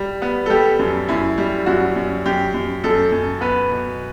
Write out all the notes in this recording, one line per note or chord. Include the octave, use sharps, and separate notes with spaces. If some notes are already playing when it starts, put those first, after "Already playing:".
Already playing: G3
B3
A4
G3 G4
F#2
F#2 E4
G3
F#2 F#4
F#2
F#2 G4
F#2
F#2 A4
F#2
B3 B4
B2